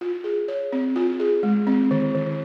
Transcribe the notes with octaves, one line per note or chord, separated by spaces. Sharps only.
F4
G#4
C#5
C4
F4
G#4
G#3
C4
D#3
D#3